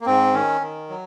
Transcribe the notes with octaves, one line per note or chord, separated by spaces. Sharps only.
A#3
G#2 C4
D#3 C#4
D#3
F#3